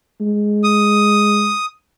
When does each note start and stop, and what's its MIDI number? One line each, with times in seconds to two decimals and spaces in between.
0.21 1.53 56
0.64 1.66 87